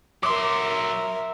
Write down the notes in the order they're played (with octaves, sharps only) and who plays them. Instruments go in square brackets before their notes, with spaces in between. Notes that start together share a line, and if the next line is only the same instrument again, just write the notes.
[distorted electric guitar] F#3 C6 [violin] A#4 E5 [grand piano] D6